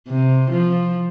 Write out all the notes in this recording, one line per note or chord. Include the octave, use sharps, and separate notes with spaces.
C3
F3